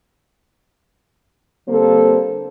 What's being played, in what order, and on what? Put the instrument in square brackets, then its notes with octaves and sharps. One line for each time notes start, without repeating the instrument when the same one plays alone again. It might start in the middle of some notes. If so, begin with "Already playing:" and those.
[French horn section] D3 G3 A#3 C4 A4 C5